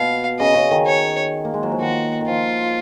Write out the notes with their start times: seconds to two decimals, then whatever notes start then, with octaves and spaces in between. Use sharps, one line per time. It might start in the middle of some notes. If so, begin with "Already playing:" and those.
Already playing: B2 F5
0.40 C#3 D#5
0.55 C#3
0.71 D#3
0.86 C#5
1.45 A#3
1.54 G#3
1.63 F#3
1.72 F3
1.81 D#3 F#4
2.21 D#3
2.27 F3 F4